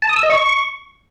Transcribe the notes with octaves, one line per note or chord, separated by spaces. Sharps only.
A5
D#6
E6
D#5
C#6